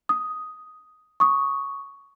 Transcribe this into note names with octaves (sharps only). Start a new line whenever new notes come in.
D#6
C#6 D#6